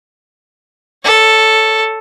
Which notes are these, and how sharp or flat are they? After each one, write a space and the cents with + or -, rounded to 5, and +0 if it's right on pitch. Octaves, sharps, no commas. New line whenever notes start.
A4 +0 C#5 +10